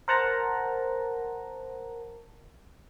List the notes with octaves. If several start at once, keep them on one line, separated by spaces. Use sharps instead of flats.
A#4 C5 F#5 A5 A#5